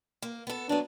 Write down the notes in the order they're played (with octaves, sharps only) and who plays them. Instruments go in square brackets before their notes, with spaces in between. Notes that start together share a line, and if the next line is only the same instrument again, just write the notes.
[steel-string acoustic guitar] A#3
B3 A4
[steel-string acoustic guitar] F#3 B3 [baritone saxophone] D4